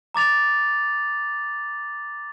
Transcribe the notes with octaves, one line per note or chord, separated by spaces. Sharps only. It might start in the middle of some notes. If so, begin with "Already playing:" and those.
A#5 D6 A6 F7